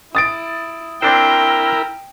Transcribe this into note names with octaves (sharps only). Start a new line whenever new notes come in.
E4 D#6 A6 D7
C4 D4 E4 A#4 C5 G5